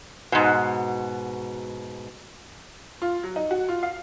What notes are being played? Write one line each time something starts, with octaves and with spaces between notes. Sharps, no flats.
G#2 B2
F4
F#3
D#4
F#4
F4
F5